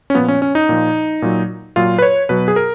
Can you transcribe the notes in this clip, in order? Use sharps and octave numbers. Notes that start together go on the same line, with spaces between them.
C#4
A#2 F3 B3
C#4
C#4
D#4
A#2 F3
A#2 F#3
A#2 F#3 F4
B4
C#5
B2 F#3 B4
G#4
A#4